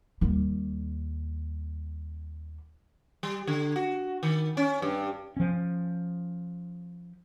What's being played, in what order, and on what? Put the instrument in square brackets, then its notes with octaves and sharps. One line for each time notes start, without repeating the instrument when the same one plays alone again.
[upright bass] D#2 G3
[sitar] G3
D3
F#4
D#3
C#4
G2
[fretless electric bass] F3 C#4